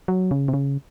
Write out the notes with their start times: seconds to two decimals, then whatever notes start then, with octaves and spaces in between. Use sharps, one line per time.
0.08 F#3
0.31 C#3
0.48 C3
0.54 C#3